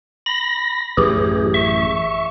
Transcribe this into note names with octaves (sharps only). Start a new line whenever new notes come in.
B5 A#6
A1 F#2 E3 G4 G#4
E5 C#6